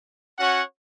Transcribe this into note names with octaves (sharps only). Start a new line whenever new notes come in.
C#4 F#4 C#5 F#5